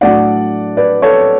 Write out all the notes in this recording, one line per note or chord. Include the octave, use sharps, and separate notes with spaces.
A2 F#3 A3 D4 D5 F#5
B4 D5
A4 C#5